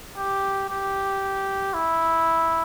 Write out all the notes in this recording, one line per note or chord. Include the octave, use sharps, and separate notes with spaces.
G4
G4
E4